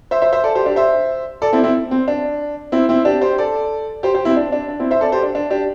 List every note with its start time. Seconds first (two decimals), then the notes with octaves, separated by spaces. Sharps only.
0.11 C5 E5
0.22 C5 E5
0.33 C5 E5
0.44 A4 D5
0.55 G4 C5
0.66 D4 G4
0.76 C5 E5
1.42 A4 D5
1.53 C4 E4
1.63 C4 E4
1.91 C4
2.08 D4
2.72 C4 E4
2.89 C4 E4
3.05 D4 G4
3.21 G4 C5
3.38 A4 D5
4.03 G4 C5
4.14 G4 C5
4.25 C4 E4
4.36 D4
4.52 D4
4.68 D4
4.80 C4 E4
4.91 C5 E5
5.01 A4 D5
5.12 G4 C5
5.23 D4
5.35 D4
5.50 D4 G4